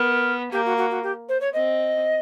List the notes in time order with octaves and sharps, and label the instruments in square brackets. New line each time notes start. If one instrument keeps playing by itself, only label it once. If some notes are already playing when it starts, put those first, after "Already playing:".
Already playing: [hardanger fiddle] B3 [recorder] A#4
[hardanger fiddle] A#3 [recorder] G4
[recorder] F#4
F#4
F#4
G4
C5
C#5
[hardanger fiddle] C4 [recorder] D#5